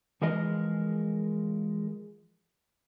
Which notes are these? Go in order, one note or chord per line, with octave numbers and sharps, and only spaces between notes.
E3 F3 G#3 G#4 A#4 D#5